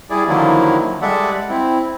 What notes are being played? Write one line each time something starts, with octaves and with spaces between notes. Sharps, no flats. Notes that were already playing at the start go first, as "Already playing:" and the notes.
G3 E4 G#4 D5
D3 D#3 F3 F#3 A#3 E4
G3 G#3 A4 D5 E5 F#5
C4 E4